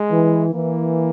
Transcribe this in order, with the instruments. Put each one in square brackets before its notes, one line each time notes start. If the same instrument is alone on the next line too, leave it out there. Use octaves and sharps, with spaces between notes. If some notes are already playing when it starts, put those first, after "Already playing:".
Already playing: [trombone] G#3
[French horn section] E3
[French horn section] E3 [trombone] A#3